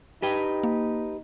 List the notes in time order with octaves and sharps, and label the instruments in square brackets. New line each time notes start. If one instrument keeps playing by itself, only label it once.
[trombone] D#4 [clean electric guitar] G4 B4 G5
[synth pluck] A#3